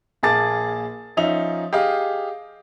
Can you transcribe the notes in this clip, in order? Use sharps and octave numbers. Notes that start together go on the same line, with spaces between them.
A#1 A#3 G#4 A5 D6 A6
F3 C#4 D#4 E5 F7
G4 G#4 D#5 F5